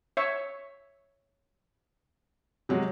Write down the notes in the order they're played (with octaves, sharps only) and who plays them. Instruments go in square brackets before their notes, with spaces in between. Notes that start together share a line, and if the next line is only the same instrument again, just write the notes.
[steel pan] C#5 E5 C#6
[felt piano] C3 F#3 G#3